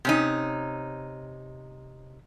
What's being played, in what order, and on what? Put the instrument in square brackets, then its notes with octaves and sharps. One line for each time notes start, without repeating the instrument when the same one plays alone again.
[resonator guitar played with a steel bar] C3 C#4 D#4